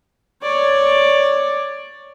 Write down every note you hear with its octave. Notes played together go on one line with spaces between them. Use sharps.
C#5 D5